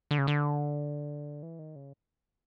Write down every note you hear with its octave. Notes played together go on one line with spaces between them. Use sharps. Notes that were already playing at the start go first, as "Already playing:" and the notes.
D3
C#3
D3
E3
D#3
C#3